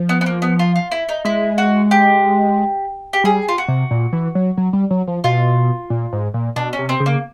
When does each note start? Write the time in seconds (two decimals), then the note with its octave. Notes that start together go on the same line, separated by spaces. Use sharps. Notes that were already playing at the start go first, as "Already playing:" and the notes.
Already playing: F3
0.09 B3
0.21 B3
0.26 A#3
0.42 B3
0.59 F4
0.76 F4
0.91 E4
1.09 D#4
1.25 G#3 E4
1.58 F#4
1.91 G4
3.13 G4
3.24 G3 G#4
3.48 F4
3.58 F#4
3.68 C3
3.91 A#2
4.13 E3
4.35 F#3
4.57 F#3
4.73 G3
4.91 F#3
5.08 F3
5.24 B2 F4
5.90 A#2
6.13 G#2
6.34 A#2
6.56 B2 D4
6.73 C#4
6.79 C3
6.89 C4
7.00 C#3
7.06 A#3